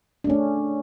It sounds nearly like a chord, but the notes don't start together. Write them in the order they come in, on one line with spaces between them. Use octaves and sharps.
D4 A3 C#4